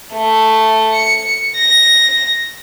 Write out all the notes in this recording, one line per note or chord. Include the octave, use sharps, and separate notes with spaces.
A3
C#7
A#6